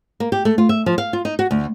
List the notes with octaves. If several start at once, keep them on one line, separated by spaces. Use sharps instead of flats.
A#3
G4
A3
F4
E5
F3
F5
F4
D#4
F#4
D2